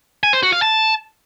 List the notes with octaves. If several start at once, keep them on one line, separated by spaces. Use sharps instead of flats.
G#5
C5
F#4
F5
A5